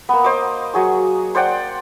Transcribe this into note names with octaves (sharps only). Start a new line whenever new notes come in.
A#3 B3
C5 D#5 D6
F#3 G#4 C#6
C5 D5 F#5 G5